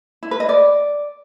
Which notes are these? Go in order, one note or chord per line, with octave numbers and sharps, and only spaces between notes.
E4
B4
D#5
D5